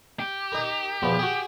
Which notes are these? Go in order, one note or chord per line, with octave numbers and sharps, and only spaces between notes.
G4
D#4 A#4
E2 B2 F3
F#4 G#4